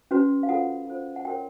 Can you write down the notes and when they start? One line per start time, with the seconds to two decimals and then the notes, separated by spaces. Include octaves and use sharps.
0.11 C#4 F#4 B4
0.43 F5
0.49 F4 A4 C5 F#5
0.87 F4 A4 C5
1.16 F#5
1.25 F#4 A#4 C#5 G5